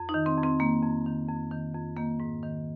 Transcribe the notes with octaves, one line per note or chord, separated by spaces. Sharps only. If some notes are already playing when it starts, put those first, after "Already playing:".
Already playing: F2
D#4
D#3
C4
F2
C4
D#3 A#3
F2
D#3
F2
D#3
F2
D#3 A#3
G#2
D#3